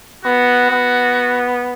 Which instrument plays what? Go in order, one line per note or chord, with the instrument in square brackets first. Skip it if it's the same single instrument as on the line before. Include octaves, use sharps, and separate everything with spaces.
[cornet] B3 [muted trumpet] F#4
[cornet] B3